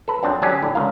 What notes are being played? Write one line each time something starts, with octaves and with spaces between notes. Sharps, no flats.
A4 B4
F2 F#3 C4 D4 C5 A5
D3 F#3 C#4 G4 G#4
A2 D3
C#2 A4 A#4 F5